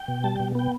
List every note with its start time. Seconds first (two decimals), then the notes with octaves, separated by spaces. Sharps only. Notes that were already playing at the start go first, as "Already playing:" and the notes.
Already playing: G5
0.08 B2
0.24 G3 A5
0.36 B2 G5
0.55 B3 G5